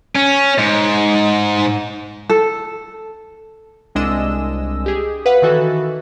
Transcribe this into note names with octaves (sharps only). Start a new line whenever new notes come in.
C#4
G#2
A4
C2 G#3 D4 D#5 E6 E7
G4 G#4
B4 F5 F#5
D#3 E3 F#4 A4